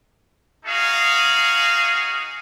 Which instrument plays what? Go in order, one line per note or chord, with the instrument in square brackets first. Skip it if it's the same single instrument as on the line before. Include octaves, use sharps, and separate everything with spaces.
[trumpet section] D#4 F#4 G#4 F5